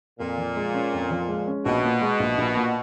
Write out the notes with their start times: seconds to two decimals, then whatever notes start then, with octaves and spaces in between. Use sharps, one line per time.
0.19 F2 A#2
0.38 F3
0.57 G#3
0.74 C#4
0.93 F2
1.10 F3
1.29 G#3
1.47 C#4
1.66 A#1 B2
1.84 A#2
2.02 G#3
2.20 A#1
2.38 A#1
2.56 A#2